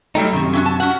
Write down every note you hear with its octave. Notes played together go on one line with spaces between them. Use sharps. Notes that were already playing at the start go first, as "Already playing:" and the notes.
F#3 G3 A3 D#4 G5 A#5
F#2 C3 D#3
C#4 E4 F#4
A5
C#4 F#4 F#5